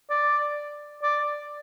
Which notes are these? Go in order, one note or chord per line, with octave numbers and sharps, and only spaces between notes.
D5
D5